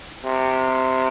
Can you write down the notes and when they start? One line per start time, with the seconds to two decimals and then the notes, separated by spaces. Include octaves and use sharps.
0.25 C3